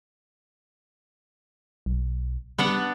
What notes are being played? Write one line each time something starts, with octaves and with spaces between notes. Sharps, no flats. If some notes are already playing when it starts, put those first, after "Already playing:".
B1
G3 B3 D4 F#5